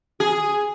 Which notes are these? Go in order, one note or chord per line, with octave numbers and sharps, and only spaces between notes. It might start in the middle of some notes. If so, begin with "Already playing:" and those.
G#4